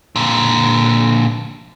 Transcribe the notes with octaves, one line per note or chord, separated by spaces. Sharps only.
A#2 D3